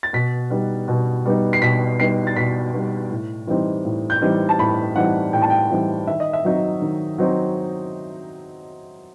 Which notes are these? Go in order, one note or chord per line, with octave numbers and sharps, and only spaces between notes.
A6
B2 B6
G3 B3 D#4
B2
G3 B3 D#4
C7
B2 B6
G3 B3 D#4 C7
A6
B2 B6
G3 B3 D#4
A2
E3 G3 C4 D#4
A2
G6
E3 G3 C4 D#4
A5
A2 B5
E3 G3 C4 D#4 F#5
A2 G5
A5
G5
E3 G3 C4 D#4
D#3 E5
D#5
E5
F#3 C4 D#4
D#3
F#3 C4 D#4